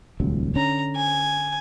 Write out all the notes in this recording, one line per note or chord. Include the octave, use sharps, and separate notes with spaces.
D#1 C#2 F#3
D3 C#4 A#5
G#5